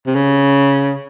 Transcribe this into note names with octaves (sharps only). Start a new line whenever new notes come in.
C3
C#3